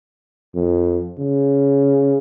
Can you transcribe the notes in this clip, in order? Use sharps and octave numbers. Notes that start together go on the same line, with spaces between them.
F2
C#3